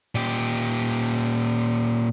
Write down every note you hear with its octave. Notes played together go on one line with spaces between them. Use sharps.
A#2 G4